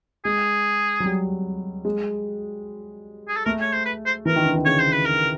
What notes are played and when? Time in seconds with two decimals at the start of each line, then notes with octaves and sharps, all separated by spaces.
0.25 G#3 G#4
1.00 F#3
1.06 G3
1.85 G#3
3.28 G#4
3.36 A4
3.45 A3 A#4
3.61 C#5
3.73 C5
3.85 B4
4.06 C5
4.25 E3 A#4
4.36 D#3
4.46 D3
4.55 D#3
4.65 C#3 C#5
4.79 C5
4.92 B4
5.06 A#4